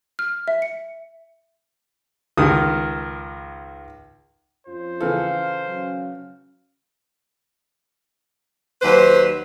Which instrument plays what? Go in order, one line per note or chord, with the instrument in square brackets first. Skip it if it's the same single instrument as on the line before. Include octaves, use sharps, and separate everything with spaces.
[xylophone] F6
E5
C#7
[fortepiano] C#2 D#3 D#6
[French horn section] F2 C#4 F4 [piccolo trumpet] C5
[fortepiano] C#3 E3 A4 [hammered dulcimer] F5
[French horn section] F#3 C#4
[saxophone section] D#2 F#3 B4 [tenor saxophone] C5